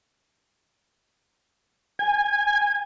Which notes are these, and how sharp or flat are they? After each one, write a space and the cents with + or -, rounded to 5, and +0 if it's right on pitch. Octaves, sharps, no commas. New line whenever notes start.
G#5 -20